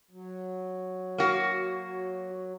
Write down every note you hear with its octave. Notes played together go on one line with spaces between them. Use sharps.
F#3
A#3 F#4